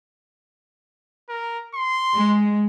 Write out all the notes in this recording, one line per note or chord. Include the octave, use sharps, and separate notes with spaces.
A#4
C6
G#3